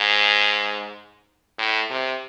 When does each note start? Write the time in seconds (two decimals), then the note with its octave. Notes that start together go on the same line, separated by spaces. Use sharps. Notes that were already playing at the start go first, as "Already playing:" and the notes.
Already playing: G#2
1.59 A2
1.90 C3